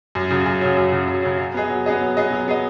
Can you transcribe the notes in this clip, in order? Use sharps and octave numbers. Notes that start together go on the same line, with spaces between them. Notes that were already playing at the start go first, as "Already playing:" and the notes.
F#2
C#3 F#3
F#2
C#3 F#3
F#2
C#3 F#3
F#2
C#3 F#3
F#3
B3 G#4 D#5
F#3
B3 G#4 D#5
F#3
B3 G#4 D#5
F#3
B3 G#4 D#5